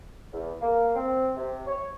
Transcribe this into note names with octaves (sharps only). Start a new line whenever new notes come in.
E2
A#3
C4
C3
C#5